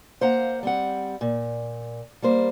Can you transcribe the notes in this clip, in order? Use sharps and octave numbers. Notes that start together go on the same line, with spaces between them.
A#3 C5 F5 F#5 A#5
G3 C4 F#5
A#2
G3 A#3 C5